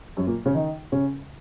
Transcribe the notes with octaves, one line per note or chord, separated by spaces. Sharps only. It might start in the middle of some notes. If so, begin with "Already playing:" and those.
F#2 F#3
A#2 A#3
C#3 C#4
D#3 D#4
C#3 C#4